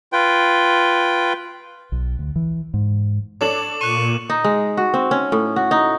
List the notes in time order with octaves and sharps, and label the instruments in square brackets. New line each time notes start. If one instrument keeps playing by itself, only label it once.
[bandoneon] F4 B4 G5
[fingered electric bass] B1
D2
E3
G#2
[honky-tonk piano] D4 A4 C#5 [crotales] D6 E7 F#7
[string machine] A#2 [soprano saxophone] C#6 [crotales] F#6 D#7
[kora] D#4
G#3
F#4
C4
C#4
A2
F#4
D#4